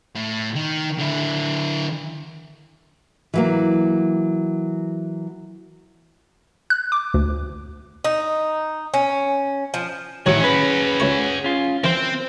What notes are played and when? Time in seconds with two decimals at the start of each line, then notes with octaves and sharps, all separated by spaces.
0.15 A2
0.55 D#3
0.98 D3 E4
3.34 E3 F#3 A#3
6.70 F#6
6.92 D6
7.14 D2
8.04 D#4
8.94 C#4
9.74 F3
10.26 A2 D#3 E3 F#3 G#4 C#5 F#5
10.41 C#4 B4
11.00 C#2 C#5 C#6
11.44 C#4 F4
11.84 E3 C4 A#4 C5